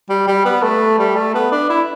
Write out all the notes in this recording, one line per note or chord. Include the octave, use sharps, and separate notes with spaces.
G3
G3
B3
A3
G3
A3
B3
D4
E4